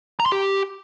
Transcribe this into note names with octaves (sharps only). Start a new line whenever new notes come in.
A#5
C6
G4